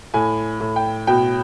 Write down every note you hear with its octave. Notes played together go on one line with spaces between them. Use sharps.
A2 G#5
A2
G5
B2 G5